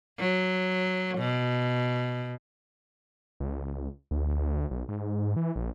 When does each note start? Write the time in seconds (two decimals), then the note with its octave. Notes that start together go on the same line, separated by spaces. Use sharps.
0.19 F#3
1.18 B2
3.40 C#2
4.11 D2
4.71 B1
4.89 G#2
5.36 E3
5.56 A#1